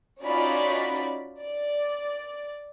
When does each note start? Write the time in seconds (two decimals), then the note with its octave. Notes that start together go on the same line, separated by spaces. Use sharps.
0.23 C#4 D#4 F4 F#4 D5 B5
1.40 D5